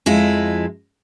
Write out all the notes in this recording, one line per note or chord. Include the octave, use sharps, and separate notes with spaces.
F2 G#3 E4 F4